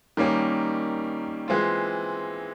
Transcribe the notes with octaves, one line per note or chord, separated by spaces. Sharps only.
D#3 G3 A#3 C#4
E3 G#3 C4 F4